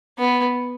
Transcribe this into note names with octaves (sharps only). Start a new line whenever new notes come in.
B3